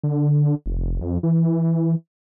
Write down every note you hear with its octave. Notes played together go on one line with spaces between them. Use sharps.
D3
F1
F2
E3